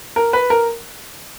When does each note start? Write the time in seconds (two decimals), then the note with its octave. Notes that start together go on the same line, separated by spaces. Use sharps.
0.16 A#4
0.33 B4
0.50 A#4